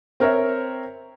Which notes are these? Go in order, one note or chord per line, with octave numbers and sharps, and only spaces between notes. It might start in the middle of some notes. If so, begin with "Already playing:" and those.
C4 A#4 C#5 E5